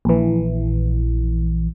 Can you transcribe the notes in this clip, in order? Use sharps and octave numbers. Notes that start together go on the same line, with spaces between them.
A#1 E3